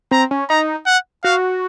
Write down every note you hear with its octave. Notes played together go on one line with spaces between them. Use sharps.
C4 A#5
C#4
D#4 A#5
F#5
F#4 F5